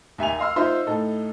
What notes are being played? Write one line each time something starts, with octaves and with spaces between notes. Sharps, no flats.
D#2 E5 G#5 F7
D#5 F5 C6 E6 F6
D#4 F4 C5 E5 C6
A2 D#4 A4